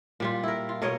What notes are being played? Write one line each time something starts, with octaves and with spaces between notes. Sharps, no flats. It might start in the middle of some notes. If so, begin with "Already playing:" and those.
A#2 G3 F4
E4 A#4
F4
B2 A#4 C#5 D#5